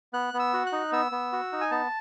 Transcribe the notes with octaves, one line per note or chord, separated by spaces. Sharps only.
B3 F#6
B3
E6
F#4
F#6
D#4
B3 E6
B3
F#4
D#4
G#5
B3 A5